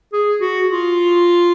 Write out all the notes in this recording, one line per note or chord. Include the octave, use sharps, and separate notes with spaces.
G#4
F#4
F4